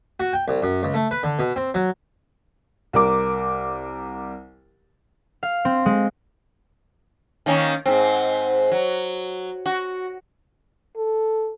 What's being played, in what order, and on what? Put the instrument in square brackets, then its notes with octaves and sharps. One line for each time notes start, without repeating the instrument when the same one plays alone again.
[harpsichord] F#4
G5
C2
F#2
C#2
A3
B4
D3
B2
C4
F#3
[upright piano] C2 A#4 D6
[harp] F5
C4
G#3
[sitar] D#3 A#3 C#4
G#2 C4
F#3
F#4
[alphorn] A4